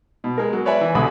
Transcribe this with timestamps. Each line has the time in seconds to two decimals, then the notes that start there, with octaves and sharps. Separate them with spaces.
0.24 B2
0.38 G#3 A#4
0.53 F#3
0.65 B4 C#5 D5 E5 G#5 B5
0.81 E3
0.95 C2 B2 D3 B5 D#6